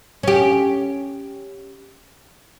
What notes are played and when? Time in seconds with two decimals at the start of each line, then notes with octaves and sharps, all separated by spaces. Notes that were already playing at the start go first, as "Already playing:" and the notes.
0.23 C#4 G4